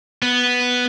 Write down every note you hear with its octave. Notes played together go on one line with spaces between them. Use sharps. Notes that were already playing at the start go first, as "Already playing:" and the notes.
B3